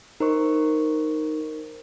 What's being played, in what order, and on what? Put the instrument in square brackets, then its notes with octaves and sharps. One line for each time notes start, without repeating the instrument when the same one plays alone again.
[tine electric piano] D#4 [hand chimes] A#4 C5 C#6